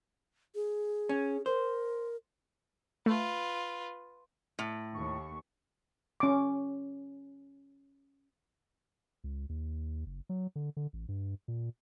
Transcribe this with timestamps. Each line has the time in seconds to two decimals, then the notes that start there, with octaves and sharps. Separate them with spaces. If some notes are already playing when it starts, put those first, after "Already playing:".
0.55 G#4
1.09 C#4
1.46 A#4 C5
3.06 A3 F4 B4
4.59 A2
4.94 D#2 C#6
6.20 C#4 D6
9.24 C#2
9.49 D#2
10.06 F#1
10.29 F#3
10.56 D3
10.77 D3
10.93 A1
11.08 G2
11.48 A#2